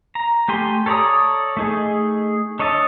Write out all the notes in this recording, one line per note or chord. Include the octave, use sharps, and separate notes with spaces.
A#5
A3 G4 G#5 C6
A4 C#5 D5 A#5 D#6
A3 D#4 G#4
D4 C#5 D#5 E5 A5